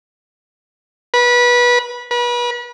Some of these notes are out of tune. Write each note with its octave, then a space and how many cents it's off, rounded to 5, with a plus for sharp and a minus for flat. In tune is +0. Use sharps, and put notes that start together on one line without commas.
B4 -25
B4 -35